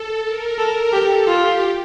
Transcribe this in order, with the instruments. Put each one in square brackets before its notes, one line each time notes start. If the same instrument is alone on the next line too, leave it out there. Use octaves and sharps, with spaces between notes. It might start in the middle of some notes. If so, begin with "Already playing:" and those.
Already playing: [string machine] A4
A#4
[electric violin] A4 [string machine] A#4
[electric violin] G4 [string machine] A4
[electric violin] F4 [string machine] G4